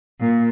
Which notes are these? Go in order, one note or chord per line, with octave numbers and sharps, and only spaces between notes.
A#2